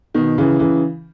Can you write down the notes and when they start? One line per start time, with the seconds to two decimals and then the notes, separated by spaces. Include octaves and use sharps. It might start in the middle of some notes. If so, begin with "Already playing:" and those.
0.14 B2 D#3
0.38 C#3 E3
0.59 C#3 E3